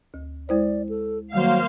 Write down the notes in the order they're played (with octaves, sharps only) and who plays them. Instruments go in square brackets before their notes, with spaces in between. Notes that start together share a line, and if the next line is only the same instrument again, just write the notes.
[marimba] D2
[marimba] G#3 E4 C5 [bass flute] D5
[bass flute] A4
[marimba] D#3 G3 [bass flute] F#3 [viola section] A#3 C5 F5